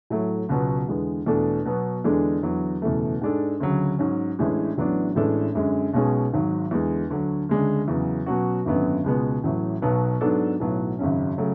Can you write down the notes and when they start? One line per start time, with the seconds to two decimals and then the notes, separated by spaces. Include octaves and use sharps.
0.10 A2 F#3 A3
0.49 C#2 B2 F#3 B3
0.88 E2 D3 G#3 B3
1.26 E2 B2 A3 D4 A4
1.65 B2 F#3 B3
2.04 E2 D3 G#3 D4 A4
2.43 E2 D3 F#3
2.82 F#1 E2 B2 A3
3.22 G#2 G#3 D4 A4
3.60 D2 C#3 F#3
3.99 G#2 F#3 C#4
4.39 A1 A2 G#3 D4
4.77 A1 A2 F#3 B3 D4
5.15 A1 A2 G#3 D4 A4
5.55 F#2 D3 G#3
5.93 B1 B2 G#3 C#4 G#4
6.33 G#1 G#2 F#3
6.71 E2 D3 G#3
7.10 D2 D3 F#3
7.49 D2 C#3 G#3 D4
7.88 E2 C#3 F#3
8.26 B2 F#3 C#4 F#4
8.65 G#1 F#2 D3 F#3 B3
9.04 C#2 B2 G#3 B3
9.44 A1 A2 F#3
9.82 B1 B2 F#3 B3
10.21 G#2 F#3 B3 D4 A4
10.60 B1 A2 F#3 B3
10.99 G#1 F#2 C#3 F#3 C#4
11.38 C#3 F#3 A3